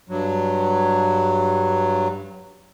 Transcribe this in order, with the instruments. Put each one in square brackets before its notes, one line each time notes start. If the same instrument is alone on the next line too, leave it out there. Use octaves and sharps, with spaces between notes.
[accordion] G2 F#3